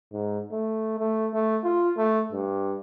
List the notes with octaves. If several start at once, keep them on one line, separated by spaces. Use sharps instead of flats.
G#2
A3
A3
A3
F4
A3
G2